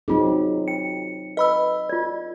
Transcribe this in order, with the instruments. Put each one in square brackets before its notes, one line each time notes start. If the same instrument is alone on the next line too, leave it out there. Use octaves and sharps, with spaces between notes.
[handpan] F#3 C4 D#4 [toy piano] F4 G#4
[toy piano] G5 [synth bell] C#7
[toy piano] B4 [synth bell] D#5 B5 E6
[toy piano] F4 D5